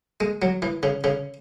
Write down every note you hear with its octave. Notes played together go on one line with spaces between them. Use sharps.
G#3
F#3
E3
C#3
C#3